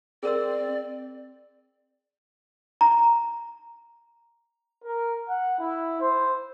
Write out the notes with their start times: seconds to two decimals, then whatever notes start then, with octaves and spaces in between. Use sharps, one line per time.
0.23 C4 G#4 A#4 D5 E6
2.81 A#5
4.85 A#4
5.29 F#5
5.60 E4
6.01 C5